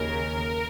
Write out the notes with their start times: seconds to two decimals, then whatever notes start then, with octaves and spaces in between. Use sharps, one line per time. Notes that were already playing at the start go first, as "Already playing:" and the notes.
Already playing: D#2 C#3 A#4